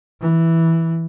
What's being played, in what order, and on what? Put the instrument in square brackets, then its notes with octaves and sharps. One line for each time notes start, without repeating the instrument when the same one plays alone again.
[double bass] E3